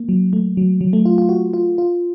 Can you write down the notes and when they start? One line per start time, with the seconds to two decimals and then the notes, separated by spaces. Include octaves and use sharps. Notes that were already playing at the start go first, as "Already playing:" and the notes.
Already playing: A#3
0.09 F#3
0.33 A3
0.57 F#3
0.81 F#3
0.93 A3
1.05 F4
1.18 F4
1.29 F#4
1.53 F4
1.78 F4